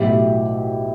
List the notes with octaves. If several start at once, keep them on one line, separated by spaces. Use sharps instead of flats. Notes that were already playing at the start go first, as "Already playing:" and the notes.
Already playing: B1 A2 F#3 E4 G4